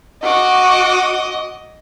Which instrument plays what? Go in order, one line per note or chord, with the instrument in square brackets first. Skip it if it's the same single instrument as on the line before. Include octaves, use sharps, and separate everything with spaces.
[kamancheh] F#4 D6 [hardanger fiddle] D#5